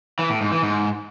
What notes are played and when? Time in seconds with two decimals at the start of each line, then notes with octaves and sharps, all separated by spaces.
0.19 E3
0.30 A2
0.41 G#2
0.52 E3
0.63 G#2